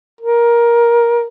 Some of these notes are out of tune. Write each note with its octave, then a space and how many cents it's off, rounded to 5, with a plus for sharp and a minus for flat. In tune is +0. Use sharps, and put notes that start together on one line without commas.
A#4 +15